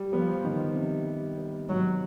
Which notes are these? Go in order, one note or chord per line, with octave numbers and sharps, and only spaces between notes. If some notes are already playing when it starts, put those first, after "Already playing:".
Already playing: G3
F3 B3
D#3
C3
G3
B3
D#3 F#3